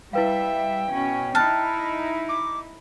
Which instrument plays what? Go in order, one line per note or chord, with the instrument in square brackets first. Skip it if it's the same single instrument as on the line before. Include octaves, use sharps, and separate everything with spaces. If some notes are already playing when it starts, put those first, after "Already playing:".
[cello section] G3 E5 [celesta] E4 B4 F5 [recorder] G5
[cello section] B2 C#4
[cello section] D#4 E4 [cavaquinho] A5 [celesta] F6 F#6 A6
[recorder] D6